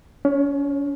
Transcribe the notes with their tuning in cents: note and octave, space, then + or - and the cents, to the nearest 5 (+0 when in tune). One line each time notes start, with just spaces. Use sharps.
C#4 +35 C#5 -10